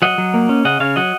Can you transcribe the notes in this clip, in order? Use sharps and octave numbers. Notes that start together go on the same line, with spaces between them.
F#3 D#5 F#5
F#3
A#3
C#4
C#3 D#5 F#5
C#3 C#5 F5
F#3 D#5 F#5